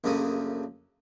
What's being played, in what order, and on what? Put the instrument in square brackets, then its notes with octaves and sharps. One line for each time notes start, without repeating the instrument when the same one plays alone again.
[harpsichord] A#1 F#2 C#3 F#3 A3 D#6